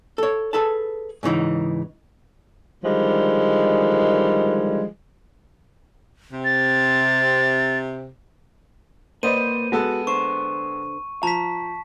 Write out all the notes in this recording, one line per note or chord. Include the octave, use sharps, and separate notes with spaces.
A4 C#5
G#4 A4 B4 A5
G#2 C#3 E3 D#4
D3 D#3 F3 G3 G#3
C3
A6
A#3 B4 C5 D5 D#5 D#7
G#3 B3 F#4 A4
D3 C5 C#6
F3 A5 A#5 B6